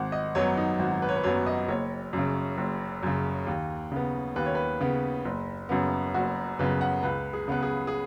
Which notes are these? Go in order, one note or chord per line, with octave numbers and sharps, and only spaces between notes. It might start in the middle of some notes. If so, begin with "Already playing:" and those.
Already playing: G#1 F#5
D#5
F#2 F#3 B3 C#5
D#4
G#1 F#4
B4
C#5
B4
F#2 F#3 B3 C#5
D#5
F#1 C#5
F#2 C#3
F#1
F#2 C#3
D#2
C#3 B3
D#2 B4
C#5
B4
C#3 B3
F#1
F#2 C#3 B3
F#1 F#4
F#2 C#3 B3 B4
F#5
C#2 B4
G#4
C#3 B3 B4
G#4
G#4